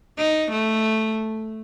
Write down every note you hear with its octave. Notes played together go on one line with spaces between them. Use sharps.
D#4
A3